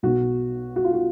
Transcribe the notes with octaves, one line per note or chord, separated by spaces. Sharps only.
B1 B2 F#4
F#4
F4
F#4